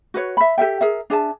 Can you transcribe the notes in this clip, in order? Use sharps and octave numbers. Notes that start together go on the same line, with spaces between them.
F#4 B4 C#5
E5 B5
G4 A4 E5 G5
G#4 A#4 E5
D4 G#4 E5 A5